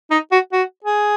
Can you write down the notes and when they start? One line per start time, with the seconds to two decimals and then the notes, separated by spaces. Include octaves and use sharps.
0.11 D#4
0.32 F#4
0.53 F#4
0.85 G#4